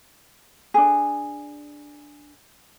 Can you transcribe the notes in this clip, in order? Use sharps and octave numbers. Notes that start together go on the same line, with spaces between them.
D4 G#4